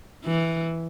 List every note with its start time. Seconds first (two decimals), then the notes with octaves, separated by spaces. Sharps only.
0.25 E3